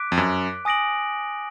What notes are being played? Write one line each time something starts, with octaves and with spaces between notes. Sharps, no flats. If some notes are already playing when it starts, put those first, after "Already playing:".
Already playing: D6 F#6 B6 D7
F2
F#2
G#5 D#6 A#6 D7 F#7